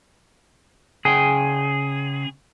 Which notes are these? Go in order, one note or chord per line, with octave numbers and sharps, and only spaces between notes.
C#3 G#4 F#5 G5